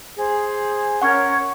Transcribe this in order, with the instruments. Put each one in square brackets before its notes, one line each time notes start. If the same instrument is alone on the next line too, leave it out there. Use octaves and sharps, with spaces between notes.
[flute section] G#4 C5
[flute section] C#4 A#4 C#5 [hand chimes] F#5 C#6